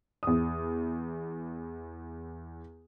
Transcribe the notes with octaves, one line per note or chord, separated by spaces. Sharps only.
E2 D#6